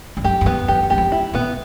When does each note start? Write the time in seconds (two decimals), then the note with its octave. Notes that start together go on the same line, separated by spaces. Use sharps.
0.17 G2
0.24 F#2 G4
0.41 F#2
0.46 G2 B3
0.68 F#2 G4
0.83 F2
0.90 F#2 G4
0.98 F2
1.12 E4
1.33 A#2 B3